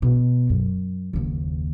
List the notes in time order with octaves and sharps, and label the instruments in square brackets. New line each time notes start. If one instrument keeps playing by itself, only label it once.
[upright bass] B2
F#2
F#1 D#2